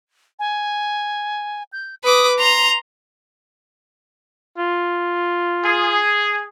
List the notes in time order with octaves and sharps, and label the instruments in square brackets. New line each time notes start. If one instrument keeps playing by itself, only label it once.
[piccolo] G#5
G6
[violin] B4 D6 [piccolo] D#6
[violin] A#5 C6 [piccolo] F7
[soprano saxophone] F4
[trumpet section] G#4